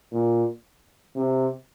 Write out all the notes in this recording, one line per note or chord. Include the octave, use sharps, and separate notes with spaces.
A#2
C3